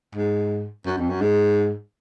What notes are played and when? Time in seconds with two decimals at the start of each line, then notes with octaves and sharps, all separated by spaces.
0.15 G#2
0.86 F#2
0.98 F2
1.10 F#2
1.21 G#2